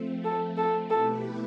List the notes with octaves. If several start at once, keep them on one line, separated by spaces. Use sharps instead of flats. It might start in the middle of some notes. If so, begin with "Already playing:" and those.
Already playing: F3 A3 C4
A4
A4
B2 A3 E4 G4 A4 B4